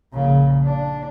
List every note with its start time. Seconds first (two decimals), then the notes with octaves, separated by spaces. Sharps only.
0.13 A#1 C#3
0.64 D4